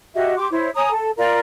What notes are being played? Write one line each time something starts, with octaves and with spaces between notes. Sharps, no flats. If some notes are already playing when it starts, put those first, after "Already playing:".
F#4 G4 D#5 E5
G4 C6 D6
E4 C5 C#5
C#5 G#5 A#5 D#6
A4
F4 A#4 D5 A#5